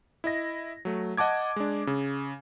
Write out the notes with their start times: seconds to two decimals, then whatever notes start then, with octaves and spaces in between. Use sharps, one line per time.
0.24 E4 D#5 A#6
0.85 F#3 A3
1.17 D#5 F#5 A5 D6 G#6
1.56 G#3 D4
1.87 C#3